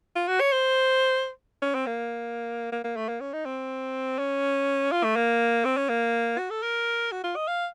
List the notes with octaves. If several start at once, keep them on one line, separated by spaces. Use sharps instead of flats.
F4
F#4
C#5
C5
C#4
C4
A#3
A#3
A#3
A3
A#3
C#4
D#4
C4
C#4
F4
A3
A#3
C4
C#4
A#3
F#4
A4
A#4
F#4
F4
D#5
F5